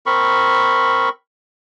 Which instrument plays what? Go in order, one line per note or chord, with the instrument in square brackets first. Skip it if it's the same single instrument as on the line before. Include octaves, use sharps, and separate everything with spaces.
[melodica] C4 A#4 B5 C#6